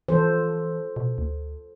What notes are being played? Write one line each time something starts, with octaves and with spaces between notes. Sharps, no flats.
E3 F3 A4 C5
B2
D2